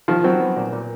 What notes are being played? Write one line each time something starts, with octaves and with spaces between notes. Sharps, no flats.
D#3 F3 F4
F#3 C4
B3
A#2
A#2